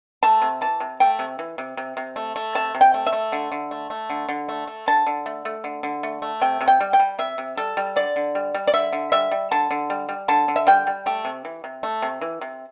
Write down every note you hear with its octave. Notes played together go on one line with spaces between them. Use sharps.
A3 A5
C3
E3 A5
C3
A3 G5
C3
E3
C3
C3
C3
A3
A3
C3 A5
C3
G5
A3
E5
A3
D3
D3
A3
A3
D3
D3
A3
A3
D3 A5
D3
A3
A3
D3
D3
A3
A3
C3 G5
C3
G5
G3
G5
G3
C3 E5
C3
G3 A4
G3
D3 D5
D3
G3
G3
D5
D3 E5
D3
G3 E5
G3
D3 A5
D3
G3
G3
D3 A5
D3
E5
G3 G5
G3
A3 G4
C3
E3
C3
A3
C3
E3
C3